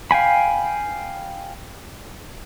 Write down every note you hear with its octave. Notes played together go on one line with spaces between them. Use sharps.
F5 G5 G#5 B5